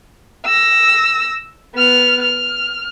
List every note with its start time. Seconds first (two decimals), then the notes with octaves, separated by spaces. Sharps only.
0.46 E6 A#6
1.75 B3 F6
2.22 F6